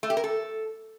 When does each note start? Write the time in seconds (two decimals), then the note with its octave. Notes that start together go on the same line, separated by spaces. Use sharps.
0.03 A3
0.10 G4
0.17 A#4
0.24 A4